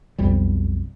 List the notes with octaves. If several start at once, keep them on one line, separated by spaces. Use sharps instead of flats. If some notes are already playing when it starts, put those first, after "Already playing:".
B1 F2 G3